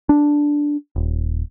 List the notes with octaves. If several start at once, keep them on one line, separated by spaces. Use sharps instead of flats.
D4
D#1